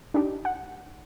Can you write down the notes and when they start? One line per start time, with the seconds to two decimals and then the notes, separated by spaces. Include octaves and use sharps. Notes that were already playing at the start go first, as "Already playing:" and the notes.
0.14 D4 D#4 G4
0.45 F#5